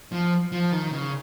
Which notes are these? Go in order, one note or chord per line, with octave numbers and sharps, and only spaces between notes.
F3
F3
D#3
C#3